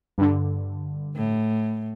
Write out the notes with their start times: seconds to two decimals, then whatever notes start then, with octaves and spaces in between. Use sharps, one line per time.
0.18 G2 D3
1.15 A2